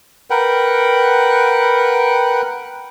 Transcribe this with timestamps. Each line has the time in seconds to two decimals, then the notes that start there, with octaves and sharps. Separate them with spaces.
0.30 A#4 B4 F#5 G5